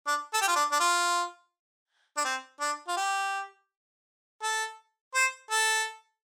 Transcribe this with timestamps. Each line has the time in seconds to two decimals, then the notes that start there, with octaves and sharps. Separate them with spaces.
0.07 D4
0.34 A4
0.42 G4
0.48 F4
0.56 D4
0.72 D4
0.80 F4
2.17 D4
2.24 C4
2.61 D4
2.88 F4
2.97 G4
4.43 A4
5.15 C5
5.51 A4